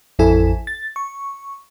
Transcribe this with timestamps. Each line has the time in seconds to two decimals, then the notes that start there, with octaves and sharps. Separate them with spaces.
0.19 A1 F2 E4 A4 G#5
0.67 A6
0.96 C#6